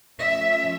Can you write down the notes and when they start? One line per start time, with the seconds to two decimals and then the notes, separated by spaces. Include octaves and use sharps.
0.19 F3 A3 C#4 E5